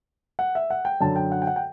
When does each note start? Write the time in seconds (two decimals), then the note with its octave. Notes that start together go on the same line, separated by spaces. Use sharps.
0.39 F#5
0.55 E5
0.70 F#5
0.85 G5
1.01 F#2 D3 A5
1.16 G5
1.32 F#5
1.42 G5
1.47 F#5
1.56 G5